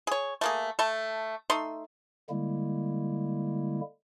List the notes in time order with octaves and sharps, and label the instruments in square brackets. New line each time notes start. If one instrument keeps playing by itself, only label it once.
[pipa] G#4 C#5
A3 A#3 G#4
A3 A4
A3 D#4 C6
[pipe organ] D3 G3 G#3 A#3 E4